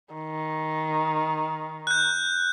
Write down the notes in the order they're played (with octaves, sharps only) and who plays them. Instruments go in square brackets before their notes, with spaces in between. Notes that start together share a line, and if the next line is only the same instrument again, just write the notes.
[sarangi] D#3
[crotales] F#6 G6